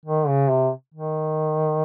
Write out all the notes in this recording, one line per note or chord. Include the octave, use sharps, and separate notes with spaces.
D#3
C#3
C3
D#3